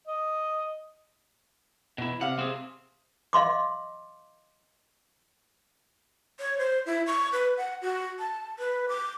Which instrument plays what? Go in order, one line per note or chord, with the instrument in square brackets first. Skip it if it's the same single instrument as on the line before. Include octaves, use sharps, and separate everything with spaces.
[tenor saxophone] D#5
[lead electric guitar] B2 E4
[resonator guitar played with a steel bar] C3 F5 [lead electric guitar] F#5
[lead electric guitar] C4 G#4
[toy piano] D#5 F5 C6 D6
[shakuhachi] C#5
C5
E4
C#6
B4
F#5
F#4
A5
B4
D6